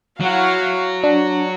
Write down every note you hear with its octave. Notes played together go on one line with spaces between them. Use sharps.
F#3 E4 F#4 F5
D4 F#4